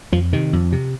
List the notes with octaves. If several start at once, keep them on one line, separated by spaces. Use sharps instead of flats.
F2 F3
C3 D#3
F2
C3